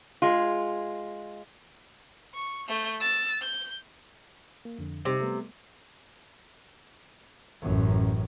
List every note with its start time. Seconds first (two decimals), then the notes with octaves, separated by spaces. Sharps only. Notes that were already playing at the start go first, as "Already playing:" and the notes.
0.22 G#3 F4
2.34 C#6
2.68 A3 G6
3.00 E6 A6
3.42 G6
4.65 A#3
4.79 F2 D3
5.05 C3 G3 C4 D#4
5.20 G3 A3 B3
7.62 A1 F#2